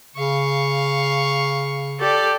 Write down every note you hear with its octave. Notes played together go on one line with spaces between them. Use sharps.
C#3 F5 C#6
G4 A4 D5